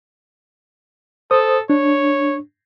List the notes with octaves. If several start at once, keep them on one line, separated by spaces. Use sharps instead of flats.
A4 C5 D#6
D4 C#5